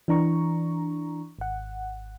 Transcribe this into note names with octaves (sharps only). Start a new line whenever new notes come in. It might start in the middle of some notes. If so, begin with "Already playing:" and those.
E3 D4 A#5 C#6
G#1 F#5